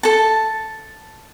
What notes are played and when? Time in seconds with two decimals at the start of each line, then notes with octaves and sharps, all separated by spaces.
0.03 A4 A5